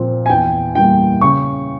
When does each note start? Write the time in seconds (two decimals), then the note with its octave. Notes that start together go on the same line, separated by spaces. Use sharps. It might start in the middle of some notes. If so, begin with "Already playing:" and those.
Already playing: A#2 F3 C4
0.26 G#5
0.29 E2 G5
0.75 E3 G3 A#3 G5
1.21 C#3 C#6